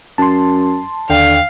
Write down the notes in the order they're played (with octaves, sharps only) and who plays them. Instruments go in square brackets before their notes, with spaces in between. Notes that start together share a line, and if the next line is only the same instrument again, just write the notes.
[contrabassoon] F#2 [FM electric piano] A5 C6
[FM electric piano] D#2 G5 [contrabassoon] D3 [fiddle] F5